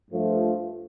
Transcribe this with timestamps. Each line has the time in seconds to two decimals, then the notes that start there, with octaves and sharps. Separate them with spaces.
0.11 G2 F3 A3